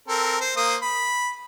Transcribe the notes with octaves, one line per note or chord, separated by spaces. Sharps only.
C4 A4 A#4
C5
A#3 C5 D#6
B5